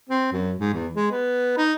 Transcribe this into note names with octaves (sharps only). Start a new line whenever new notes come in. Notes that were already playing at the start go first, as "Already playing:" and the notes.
C4
F#2
G#2
E2
G#3
B3
D#4